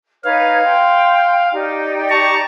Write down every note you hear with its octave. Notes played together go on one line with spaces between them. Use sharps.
D#4 B4 C#5 F5
G5 C6
D#4 G4 D5
A5 A#5 C#6